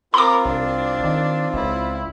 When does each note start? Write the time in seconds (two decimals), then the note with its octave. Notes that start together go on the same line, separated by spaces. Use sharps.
0.14 C4 F4 A#4 B5 D6
0.45 C2 D4
1.03 D#3
1.54 C#2 E4